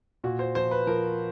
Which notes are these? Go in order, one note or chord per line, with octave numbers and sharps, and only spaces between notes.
A#2 F#4
C5
F3 C5
B4
F3 A#4